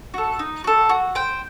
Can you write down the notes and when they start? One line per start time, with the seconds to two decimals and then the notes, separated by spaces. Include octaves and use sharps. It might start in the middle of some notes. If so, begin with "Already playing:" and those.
0.14 F#4 A4
0.39 D#4
0.64 F#4 A4
0.89 F#4
1.15 C5 G5